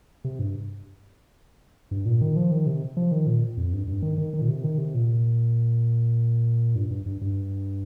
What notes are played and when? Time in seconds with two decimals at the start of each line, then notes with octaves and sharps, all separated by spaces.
0.24 C3
0.39 G2
1.91 G2
2.06 A#2
2.21 D#3
2.36 F3
2.51 D#3
2.66 C3
2.97 F3
3.12 D#3
3.27 A#2
3.57 F2
3.73 G2
3.88 G2
4.03 D#3
4.18 D#3
4.33 D#3
4.42 A#2
4.48 C3
4.64 D#3
4.78 C3
4.94 A#2
6.75 G2
6.91 G2
7.06 G2
7.21 G2